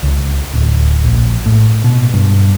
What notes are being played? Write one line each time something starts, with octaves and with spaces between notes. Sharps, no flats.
C#2
D1
A#1
A2
B2
G2